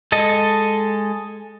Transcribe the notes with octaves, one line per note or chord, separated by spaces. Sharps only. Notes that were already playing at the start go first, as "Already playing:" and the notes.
G#3 A4 D#5